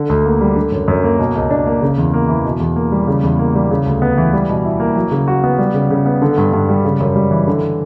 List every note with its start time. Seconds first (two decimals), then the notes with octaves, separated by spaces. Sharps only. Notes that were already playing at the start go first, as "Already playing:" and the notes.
Already playing: D3
0.09 D2
0.25 A#3
0.41 G3
0.56 D3
0.72 F#2
0.88 F#2
1.04 A#3
1.19 B2
1.35 C#2
1.51 D4
1.66 A#3
1.82 C#3
1.98 E2
2.13 A#3
2.29 E3
2.45 B2
2.60 E2
2.76 A#3
2.92 G3
3.07 C#3
3.23 E2
3.39 A#3
3.55 G3
3.71 C#3
3.86 D2
4.02 B3
4.18 E3
4.33 G3
4.49 B2
4.65 E4
4.80 A#3
4.95 F#3
5.11 C#3
5.28 F#4
5.44 B3
5.59 G3
5.74 C#3
5.90 C#3
6.06 B3
6.22 D3
6.38 G2
6.53 G2
6.69 G3
6.84 C#3
7.00 F#2
7.16 G3
7.31 E3
7.47 D3